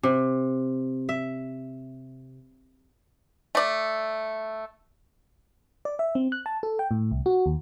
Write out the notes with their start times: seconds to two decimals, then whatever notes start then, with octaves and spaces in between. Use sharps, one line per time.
0.03 C3
1.09 E5
3.55 A3 D5
5.85 D5
5.99 E5
6.15 C4
6.32 F#6
6.46 A5
6.63 A4
6.79 G5
6.91 A2
7.11 C2
7.26 F#4
7.46 D#2